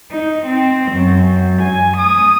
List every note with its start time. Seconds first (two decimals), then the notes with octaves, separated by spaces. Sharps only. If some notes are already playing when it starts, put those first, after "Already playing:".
0.10 D#4
0.45 C4
0.92 F#2
1.61 G#5
1.97 D#6